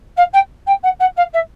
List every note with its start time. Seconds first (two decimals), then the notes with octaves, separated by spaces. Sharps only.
0.17 F5
0.33 G5
0.66 G5
0.83 F#5
1.00 F#5
1.16 F5
1.33 E5